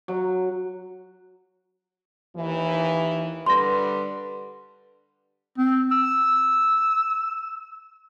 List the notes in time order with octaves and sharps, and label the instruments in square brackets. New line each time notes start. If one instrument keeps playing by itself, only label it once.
[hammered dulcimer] F#3
[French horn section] D#2 D#3 E3
[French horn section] D3 G3 B4 [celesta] C6 A#6
[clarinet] C4
E6